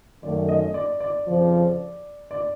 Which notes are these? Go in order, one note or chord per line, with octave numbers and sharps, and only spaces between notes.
F#2 D#3 F#3 A3 D5
D#5
D5
D5
F2 C#3 F3
D5